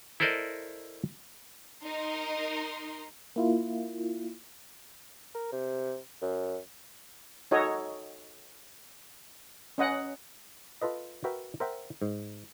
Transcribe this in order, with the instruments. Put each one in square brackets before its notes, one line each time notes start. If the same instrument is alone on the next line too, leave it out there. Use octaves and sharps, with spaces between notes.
[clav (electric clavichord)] E4 A4 A#4 C5 D5 D#5
[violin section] D#4 A#4 D#5 C6
[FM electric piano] A#3 E4 F4
[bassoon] A#4
C3
F#2
[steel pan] D#4 F#4 A4 C#5 D#5
C#4 D#5 F#5
[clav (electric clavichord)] F4 A4 B4 D#5
F#4 A#4 B4 E5 G5
A#4 C5 E5 F#5 G5
G#2